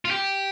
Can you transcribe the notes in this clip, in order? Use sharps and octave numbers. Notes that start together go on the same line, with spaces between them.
F4
G4